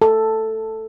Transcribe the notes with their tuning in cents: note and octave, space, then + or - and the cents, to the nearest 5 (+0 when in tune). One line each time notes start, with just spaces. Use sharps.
A4 +5